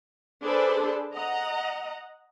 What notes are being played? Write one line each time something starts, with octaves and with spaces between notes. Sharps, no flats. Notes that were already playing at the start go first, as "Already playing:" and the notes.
D4 G#4 A4 B4 C5 D5
D#5 F#5 A#5